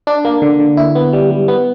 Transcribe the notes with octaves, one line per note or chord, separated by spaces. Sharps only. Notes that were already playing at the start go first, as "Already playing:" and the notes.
D4
A#3
D3
D3
E4
B3
G3
G3
B3